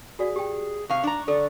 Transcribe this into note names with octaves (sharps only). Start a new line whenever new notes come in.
F#4 G#4 D5 F5
G4 G5
C3 F5 C#6
D4 A#5
D3 A4 D5